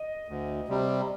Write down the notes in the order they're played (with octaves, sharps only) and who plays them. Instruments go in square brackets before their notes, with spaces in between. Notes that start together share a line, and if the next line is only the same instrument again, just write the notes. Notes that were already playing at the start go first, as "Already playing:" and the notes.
Already playing: [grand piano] D#5
[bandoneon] D2
C3 G3